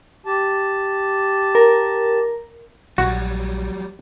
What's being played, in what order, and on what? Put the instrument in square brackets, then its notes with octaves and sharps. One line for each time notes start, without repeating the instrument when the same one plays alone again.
[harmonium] G4 A5
[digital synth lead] A#4
[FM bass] A#1 [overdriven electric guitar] F#3 G3 [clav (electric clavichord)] F#4